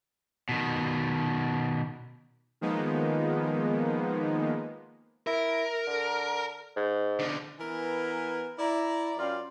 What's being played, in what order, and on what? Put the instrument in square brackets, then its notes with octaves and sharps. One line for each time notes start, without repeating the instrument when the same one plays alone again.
[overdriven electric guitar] B2 D#3
[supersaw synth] D#3 F3 G#3 A#3 B3 D#4
[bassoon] E4 [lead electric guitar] A#4
[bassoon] D3
G#2
[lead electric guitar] B2 D3
[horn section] E3 B3 A#4 B4 G#5 A#5
E4 D5 A#5
F#2 C#4 F4 D5 F5 G5